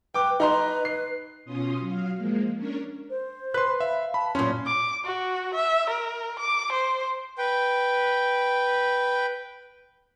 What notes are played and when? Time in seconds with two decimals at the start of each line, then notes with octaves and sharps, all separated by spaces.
0.14 B4 G5 D6
0.40 D#4 B4 A#5 C6
0.85 C7
1.45 B2 C#4 F4 C6 D#6
1.80 F#3 F5
2.16 F3 G#3 A#3
2.55 C#4 D4 A#4 C#5
3.10 C5
3.54 B4 C6 F#6
3.80 E5 F5
4.14 A5 B5
4.35 F#2 A#2 C#4 C6
4.66 D6
5.05 F#4
5.54 E5
5.90 A#4
6.39 D6
6.72 C5
7.38 B4 G5